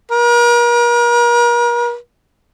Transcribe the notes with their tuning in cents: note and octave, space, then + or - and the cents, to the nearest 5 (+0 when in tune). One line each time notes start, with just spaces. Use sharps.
A#4 +40